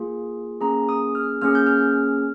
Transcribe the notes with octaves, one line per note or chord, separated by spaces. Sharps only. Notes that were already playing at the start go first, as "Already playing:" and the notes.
Already playing: A#3 F4 G#4
A#3 C#4 G#4 A#5
D#6
F6
A#3 C#4 G#4 F6
G6
F6